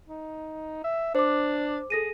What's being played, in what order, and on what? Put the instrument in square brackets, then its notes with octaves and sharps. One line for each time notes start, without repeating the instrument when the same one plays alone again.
[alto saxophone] D#4
E5
[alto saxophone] D4 [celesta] C5 D6
[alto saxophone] G#4 [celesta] A4 A#6 D#7